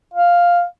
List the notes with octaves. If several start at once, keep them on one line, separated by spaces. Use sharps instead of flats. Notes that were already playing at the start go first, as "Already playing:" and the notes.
F5